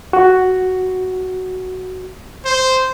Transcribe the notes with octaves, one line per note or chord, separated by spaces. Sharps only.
F#4
C5